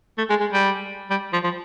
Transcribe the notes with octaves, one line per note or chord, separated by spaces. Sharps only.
A3
G#3
G#3
G3
G3
F3
F3